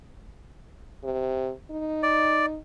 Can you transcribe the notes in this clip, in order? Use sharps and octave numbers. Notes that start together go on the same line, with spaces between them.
C3
D#4
D5